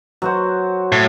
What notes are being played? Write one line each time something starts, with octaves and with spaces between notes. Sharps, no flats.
F#3 F#4 C5
A2